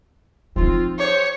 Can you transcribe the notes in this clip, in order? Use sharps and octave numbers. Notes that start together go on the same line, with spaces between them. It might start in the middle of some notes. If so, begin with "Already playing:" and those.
F3 C4 D#4 F4
G4 G#4 C5 C#5